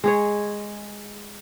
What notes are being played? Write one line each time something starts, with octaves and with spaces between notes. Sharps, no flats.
G#3 G#4 C#5